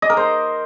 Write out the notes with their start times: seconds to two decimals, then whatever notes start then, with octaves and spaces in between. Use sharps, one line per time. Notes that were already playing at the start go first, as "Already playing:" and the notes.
0.02 D#5
0.10 A#4
0.17 C5